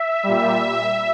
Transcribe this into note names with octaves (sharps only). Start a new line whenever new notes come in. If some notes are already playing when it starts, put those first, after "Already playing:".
Already playing: E5
A#2 G3